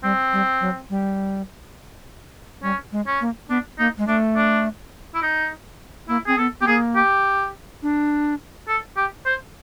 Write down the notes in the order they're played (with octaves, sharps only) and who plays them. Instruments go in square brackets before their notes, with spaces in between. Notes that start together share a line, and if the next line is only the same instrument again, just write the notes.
[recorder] G3 [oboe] C4
[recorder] G3
F#3
G3
[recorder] G3 [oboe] C#4
[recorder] G#3
[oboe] C#4
[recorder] A#3
[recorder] B3 [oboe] D4
[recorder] A#3 [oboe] D#4
[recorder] G#3
[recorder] A3 [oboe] D4
[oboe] D4
E4
D#4
[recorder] A#3 [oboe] E4
[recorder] C4 [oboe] G#4
[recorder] B3 [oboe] A4
[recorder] B3 [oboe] G4
[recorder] A#3 [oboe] G#4
[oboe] G4
[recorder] D4
[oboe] A4
G4
C5